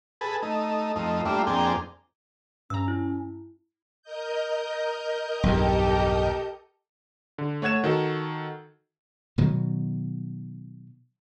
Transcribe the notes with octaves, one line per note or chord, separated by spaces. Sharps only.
G#4 A4 B4
A3 D#4
F2 A3 D#4
G3 A3 A#3 D4 E4 F4
F2 A#3 C4 D4 G#4 G5
G2 C#4 A#5 E6
E4
A#4 D#5 G6
B1 E2 G2 G4 A4
D3
A3 C#5 F#5 G#6 E7
D#3 F#4 A4
B2 D#3 F#3